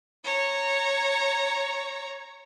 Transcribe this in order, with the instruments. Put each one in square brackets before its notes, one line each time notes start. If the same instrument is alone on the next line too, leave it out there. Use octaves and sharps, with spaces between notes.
[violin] C#5 A#5